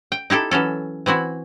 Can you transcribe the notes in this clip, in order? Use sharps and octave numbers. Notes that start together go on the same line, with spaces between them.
G5
D#4 E4 G4 A4
E3 F#3 C#4 A4
E3 C4 E4 F#4